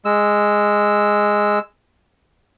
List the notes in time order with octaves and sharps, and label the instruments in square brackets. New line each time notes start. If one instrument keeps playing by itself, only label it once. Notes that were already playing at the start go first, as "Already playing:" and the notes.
[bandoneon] G#3 E6